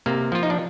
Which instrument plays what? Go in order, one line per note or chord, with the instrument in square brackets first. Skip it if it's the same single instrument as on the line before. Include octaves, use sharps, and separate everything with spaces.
[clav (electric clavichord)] C3 A#3
F3 F4
D#4
D4